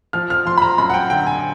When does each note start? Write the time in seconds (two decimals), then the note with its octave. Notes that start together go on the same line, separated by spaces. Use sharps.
0.13 F3 F6
0.30 F6
0.45 F3 C6
0.58 B5
0.62 A#5
0.78 F#2 B5
0.90 F#5
0.94 G5
1.10 D3 G5
1.27 G#5